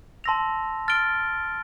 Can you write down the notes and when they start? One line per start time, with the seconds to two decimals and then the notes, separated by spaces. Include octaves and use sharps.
0.24 A5 C6 E6 A#6 F7
0.88 F6 A6 D7 G7